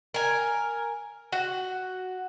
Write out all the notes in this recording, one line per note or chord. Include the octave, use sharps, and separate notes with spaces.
A#4 G#5
F#4